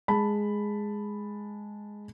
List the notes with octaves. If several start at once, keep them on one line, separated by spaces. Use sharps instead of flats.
G#3 A5 B5